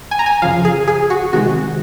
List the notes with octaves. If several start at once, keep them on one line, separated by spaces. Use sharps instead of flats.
G#5
A#5
G#5
F#2 C#3 F3 F5
G#4
G#4
F#4
C3 D#3 G#3 F#4